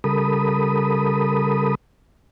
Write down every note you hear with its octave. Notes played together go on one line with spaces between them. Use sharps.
C#3 G3 A4 A#4 B5 D#6